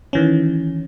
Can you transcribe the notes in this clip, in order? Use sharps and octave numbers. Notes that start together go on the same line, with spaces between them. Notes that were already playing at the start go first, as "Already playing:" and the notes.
D#3 E3 C#4